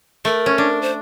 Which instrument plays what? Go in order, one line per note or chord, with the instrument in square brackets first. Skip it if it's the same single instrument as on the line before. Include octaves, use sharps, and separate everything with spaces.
[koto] A3 [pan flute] A#4
[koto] C#4
D4
[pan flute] C5